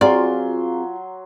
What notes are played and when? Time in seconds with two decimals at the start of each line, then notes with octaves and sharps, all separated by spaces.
0.01 F#3 C4 F4 G#4 D5 C6